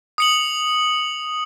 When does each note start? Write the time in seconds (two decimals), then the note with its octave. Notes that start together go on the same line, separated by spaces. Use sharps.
0.18 D#6 C#7 F#7